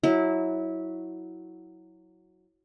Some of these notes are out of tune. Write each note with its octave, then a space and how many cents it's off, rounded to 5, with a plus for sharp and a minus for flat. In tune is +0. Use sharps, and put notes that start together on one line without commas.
F#3 -5 E4 -20